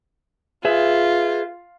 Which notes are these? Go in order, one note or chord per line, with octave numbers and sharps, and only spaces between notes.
F4 G#4 B4 E5